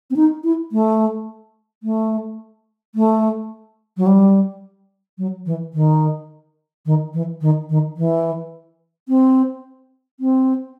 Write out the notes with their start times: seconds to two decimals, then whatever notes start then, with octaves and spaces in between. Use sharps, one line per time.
0.11 C4
0.16 D#4
0.44 E4
0.72 A3
1.83 A3
2.95 A3
3.97 F#3
4.06 G3
5.18 F#3
5.46 E3
5.74 D#3
6.86 D#3
7.14 E3
7.41 D#3
7.69 D#3
7.97 E3
9.09 C4
10.20 C4